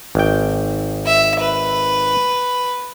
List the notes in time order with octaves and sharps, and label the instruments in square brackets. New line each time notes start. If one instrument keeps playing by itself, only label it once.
[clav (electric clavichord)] G#1 G5
[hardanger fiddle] E5
B4